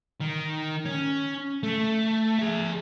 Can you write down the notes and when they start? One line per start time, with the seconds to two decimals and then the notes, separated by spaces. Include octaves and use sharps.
0.20 D#3
0.85 C#4
1.63 A3
2.39 G#4 E5